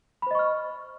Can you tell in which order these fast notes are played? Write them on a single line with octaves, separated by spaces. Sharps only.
B5 C5 D#5 C#6 F6